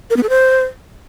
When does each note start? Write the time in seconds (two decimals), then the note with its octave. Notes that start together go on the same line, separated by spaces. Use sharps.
0.10 A#4
0.17 B3
0.23 A4
0.29 C5